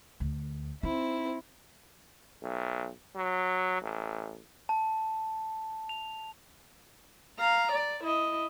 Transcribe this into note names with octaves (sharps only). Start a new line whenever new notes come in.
D2
C4 D#4 E4
B1
F#3
A1
A5
F7
F5 A#5
D5
E4 D#5